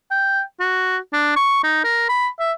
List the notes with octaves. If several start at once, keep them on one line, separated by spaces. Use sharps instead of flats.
G5
F#4
D4
C#6
D#4
A#4
B5
E5